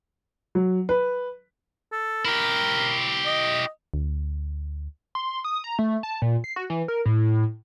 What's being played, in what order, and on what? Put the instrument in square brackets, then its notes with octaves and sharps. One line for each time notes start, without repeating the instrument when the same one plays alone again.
[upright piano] F#3
B4
[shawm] A4
[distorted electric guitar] E4 G4 [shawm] A#4
[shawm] D#5
[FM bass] D2
[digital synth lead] C6
D#6
A#5
A3
A5
A#2
C7
F#4
E3
A#4
A2